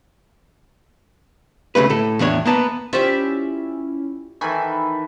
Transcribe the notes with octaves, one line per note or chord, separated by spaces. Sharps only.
D2 C#3 A3 B4
A2 A4
E2 A2 D4 C#5
A#3 B3 A5
C#4 E4 F4 G4 C5 D5 E5
D#3 E3 A4 G#5 B5 C#6